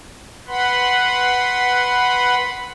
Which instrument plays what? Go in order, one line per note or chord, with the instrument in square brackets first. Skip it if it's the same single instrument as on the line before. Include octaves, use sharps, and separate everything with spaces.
[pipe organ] B4 F#5 B5 C6